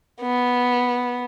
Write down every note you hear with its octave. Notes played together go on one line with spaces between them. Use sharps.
B3